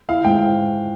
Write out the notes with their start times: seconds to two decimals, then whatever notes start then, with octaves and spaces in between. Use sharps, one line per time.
0.09 E4 F5
0.24 G#2 G5